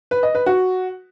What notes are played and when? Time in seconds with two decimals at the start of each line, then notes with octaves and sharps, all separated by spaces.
0.11 B4
0.23 D#5
0.35 B4
0.46 F#4